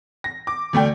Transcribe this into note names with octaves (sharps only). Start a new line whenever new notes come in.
A#6
D6
D2 A3 D5 G5